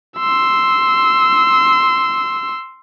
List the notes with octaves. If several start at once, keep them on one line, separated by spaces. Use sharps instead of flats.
C6 E6